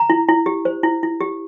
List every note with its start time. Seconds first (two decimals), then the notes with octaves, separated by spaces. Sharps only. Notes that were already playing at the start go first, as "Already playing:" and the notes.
Already playing: A#5
0.10 E4
0.28 E4
0.46 G4
0.65 C5
0.83 E4
1.03 E4
1.21 G4